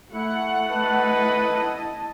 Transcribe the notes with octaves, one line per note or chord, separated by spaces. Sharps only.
A3 E4 F#5 C#7
E4 B4 D#5 A5